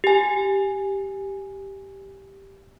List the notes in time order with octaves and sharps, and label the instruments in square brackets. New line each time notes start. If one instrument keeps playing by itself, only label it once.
[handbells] G4 G#5